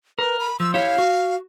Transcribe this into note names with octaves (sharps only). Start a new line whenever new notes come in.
A#4 B4
B5
F3 E6
E4 G4 C#5 F5
F#4